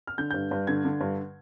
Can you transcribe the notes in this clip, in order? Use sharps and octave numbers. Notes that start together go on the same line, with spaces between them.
F6
D3 G6
G2 G6
G2
D3 G#6
D3
G2